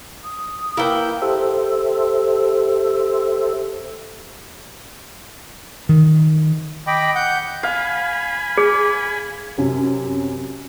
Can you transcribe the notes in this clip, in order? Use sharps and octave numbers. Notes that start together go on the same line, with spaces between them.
D#6
A#3 E4 B4 G5
G4 A4 C5 E5
D#3
D#5 G5 B5 D6
F#5 G6
F5 G#5 B5
G#4
F#2 C3 F#3